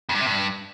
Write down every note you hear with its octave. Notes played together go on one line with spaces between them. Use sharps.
F2
G2
C3
G2